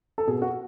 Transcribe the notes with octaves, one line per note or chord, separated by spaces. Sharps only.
A4
B2 G#4
F#4